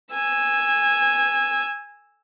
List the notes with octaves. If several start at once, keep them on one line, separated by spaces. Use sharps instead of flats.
G#5 E6